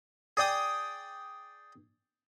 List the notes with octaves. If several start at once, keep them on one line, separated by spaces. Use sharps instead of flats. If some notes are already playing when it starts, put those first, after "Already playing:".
G#4 D5 G5 D#6